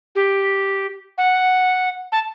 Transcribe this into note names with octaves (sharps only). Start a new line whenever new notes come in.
G4
F#5
A5